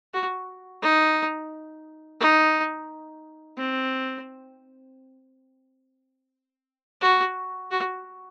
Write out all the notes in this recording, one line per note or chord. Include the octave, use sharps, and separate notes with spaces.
F#4
D#4
D#4
C4
F#4
F#4